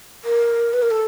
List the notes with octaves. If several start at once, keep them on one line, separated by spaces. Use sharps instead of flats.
A#4
B4
A#4
A4